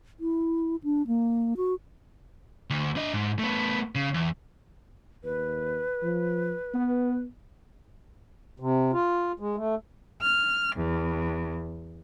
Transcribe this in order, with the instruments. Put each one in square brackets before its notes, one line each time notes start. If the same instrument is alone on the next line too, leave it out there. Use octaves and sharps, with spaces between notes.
[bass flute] E4
D4
A#3
F#4
[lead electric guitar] D2
D4 D#5
G#2
A3 B3
C#3
E2
[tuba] D#2 [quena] B4
[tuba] F3
B3
[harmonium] C3
F4
G#3
A3
[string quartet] F6
E2